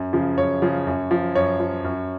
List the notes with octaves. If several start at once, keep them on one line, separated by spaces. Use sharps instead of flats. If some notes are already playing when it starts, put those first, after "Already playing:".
Already playing: F#2
C#3 F3
F#2 C#5
C#3 F3
F#2
F3
F#2 C#5
F3
F#2